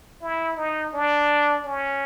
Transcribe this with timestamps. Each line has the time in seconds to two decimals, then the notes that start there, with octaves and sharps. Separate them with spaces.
0.22 E4
0.57 D#4
0.93 D4
1.65 C#4